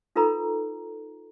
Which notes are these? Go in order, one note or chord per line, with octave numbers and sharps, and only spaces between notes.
D#4 F4 A4 B4 A#5